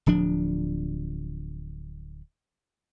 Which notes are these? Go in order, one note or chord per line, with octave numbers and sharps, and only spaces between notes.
D1 F3 D4